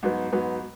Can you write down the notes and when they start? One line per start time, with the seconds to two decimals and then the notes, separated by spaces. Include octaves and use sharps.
0.03 G#2 F#3 B3
0.32 G#2 F#3 B3